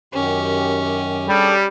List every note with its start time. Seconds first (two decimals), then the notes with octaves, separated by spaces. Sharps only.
0.14 F#2 D#3 C#4 G4
1.28 G3 D4 G#4 A4